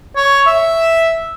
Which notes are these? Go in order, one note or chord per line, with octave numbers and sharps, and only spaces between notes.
C#5
E5